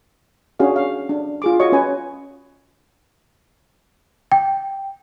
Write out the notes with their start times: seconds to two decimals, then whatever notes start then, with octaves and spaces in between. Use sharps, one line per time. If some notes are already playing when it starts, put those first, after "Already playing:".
0.60 C#4 D4 F#4 G#4 F5
0.76 F5
1.09 D4
1.42 F4 G#4 D6
1.60 F4 F#4 C#5 D#5 C#6
1.72 C#4 B4 G#5
4.32 G5